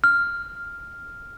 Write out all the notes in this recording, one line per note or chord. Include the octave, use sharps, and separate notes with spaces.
F6